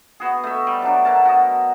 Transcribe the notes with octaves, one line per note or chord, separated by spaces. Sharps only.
B3 F#4 G#4
A3 D#5 E5
G3
F#3 D4
B2 A#4 A5
F#4 D#5